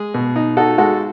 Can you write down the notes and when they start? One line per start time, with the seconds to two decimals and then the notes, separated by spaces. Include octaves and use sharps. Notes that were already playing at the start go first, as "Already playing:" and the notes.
Already playing: G#3 G#4
0.14 B2
0.36 D#4
0.57 D#4 F#4 A4
0.78 G#3 F#4 A4